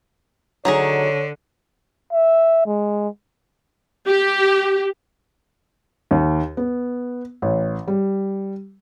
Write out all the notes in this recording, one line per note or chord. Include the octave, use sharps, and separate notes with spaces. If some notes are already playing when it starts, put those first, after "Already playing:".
D3 F#3 D#4 G#4 C#5
E5
G#3
G4
D#2
B3
A1
G3